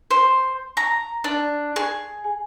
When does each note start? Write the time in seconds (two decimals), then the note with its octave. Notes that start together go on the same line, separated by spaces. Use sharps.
0.11 C5
0.77 A#5
1.24 D4
1.76 G#4